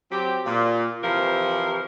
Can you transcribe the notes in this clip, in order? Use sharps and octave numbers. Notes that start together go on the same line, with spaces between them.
F#3 C4 G4
A#2
C3 E3 F3 A#4